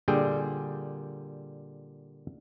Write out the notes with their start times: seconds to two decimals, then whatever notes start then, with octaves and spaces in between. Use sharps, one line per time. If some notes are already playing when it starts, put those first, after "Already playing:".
0.08 A#2 D3 G3 G#4 G5